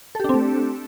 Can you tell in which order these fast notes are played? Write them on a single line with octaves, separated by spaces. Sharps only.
A4 G4 D4 C4 A3